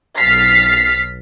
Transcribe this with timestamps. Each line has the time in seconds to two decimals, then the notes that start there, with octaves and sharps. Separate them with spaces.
0.18 B1 F6 A6 B6 C7